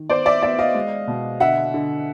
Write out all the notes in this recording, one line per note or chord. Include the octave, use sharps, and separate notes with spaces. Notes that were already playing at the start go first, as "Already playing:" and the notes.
Already playing: D#3
B3 C5 D5
D5 E5
B3 D5 E5
D#5 F5
G#3
B2
D3 E5 F#5
D3